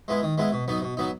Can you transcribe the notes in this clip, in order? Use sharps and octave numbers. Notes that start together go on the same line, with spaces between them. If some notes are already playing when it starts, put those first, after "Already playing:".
G#3 B3 E4
D#3
G#3 B3 E4
B2
F#3 B3 D#4
B2
F#3 B3 D#4